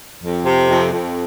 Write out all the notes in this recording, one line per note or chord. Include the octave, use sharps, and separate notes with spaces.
F2
C3
F2
F2